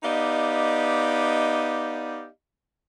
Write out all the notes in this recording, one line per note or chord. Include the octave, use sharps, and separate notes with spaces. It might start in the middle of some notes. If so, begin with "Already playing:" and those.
B3 D#4 G4 D5 D#5 F5